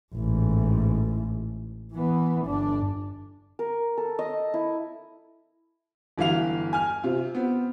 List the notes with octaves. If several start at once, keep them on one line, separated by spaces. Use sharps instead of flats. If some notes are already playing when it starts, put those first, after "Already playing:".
A1 G#2
E3 B3
G1 D4
A#4
A4
D#5
E4
G1 E3 F#3 F5 F7
G#5 F6
C3 F4
B3 C4